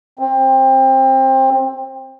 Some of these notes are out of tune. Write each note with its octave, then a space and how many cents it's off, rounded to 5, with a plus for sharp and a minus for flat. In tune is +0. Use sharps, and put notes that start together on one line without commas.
C4 +20